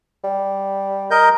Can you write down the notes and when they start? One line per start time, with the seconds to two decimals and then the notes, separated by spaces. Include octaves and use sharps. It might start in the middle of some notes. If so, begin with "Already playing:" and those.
0.24 G3
1.11 A#4 D#5 G6